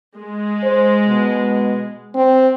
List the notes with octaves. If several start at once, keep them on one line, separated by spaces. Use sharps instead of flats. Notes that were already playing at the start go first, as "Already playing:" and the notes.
G#3
C5
B2
C4